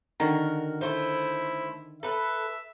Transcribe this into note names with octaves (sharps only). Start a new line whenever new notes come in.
D3 D#3 F#4 A#4 A#5
A3 E4 C5
A4 B4 E5